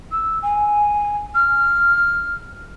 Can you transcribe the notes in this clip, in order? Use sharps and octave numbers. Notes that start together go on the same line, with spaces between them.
E6
G#5
F6